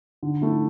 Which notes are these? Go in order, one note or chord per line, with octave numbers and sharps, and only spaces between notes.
D3
A3 E4